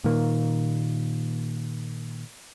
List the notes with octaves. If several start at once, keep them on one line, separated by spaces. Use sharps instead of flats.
A#2 D#3 A#3